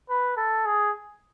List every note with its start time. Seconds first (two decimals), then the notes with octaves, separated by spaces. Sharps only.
0.09 B4
0.37 A4
0.65 G#4